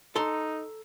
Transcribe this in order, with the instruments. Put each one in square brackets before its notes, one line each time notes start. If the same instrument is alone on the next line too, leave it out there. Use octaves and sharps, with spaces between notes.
[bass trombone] D#4 [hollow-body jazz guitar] A4 A#5 C6